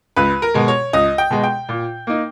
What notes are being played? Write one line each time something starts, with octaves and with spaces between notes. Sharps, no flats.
C#2 B4
A#4
B2 G#3
C#5
C#2 D#5
G5
B2 G#3
G5
A#2
A#3 D#4